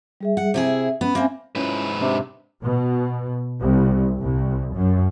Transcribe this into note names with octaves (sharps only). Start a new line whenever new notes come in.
G3 G#4 E5
F#5
C3 E4 G#4 E5
B3 C#4 B5
A#3 C4 E5 G#5
G#2 C#4 E4 F4 B4
C3 D4
B2
C2
C2
F#2